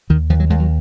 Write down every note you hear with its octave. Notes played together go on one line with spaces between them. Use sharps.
D#2 D#3
D#2 F3
F#3
D#2 G#3
F#3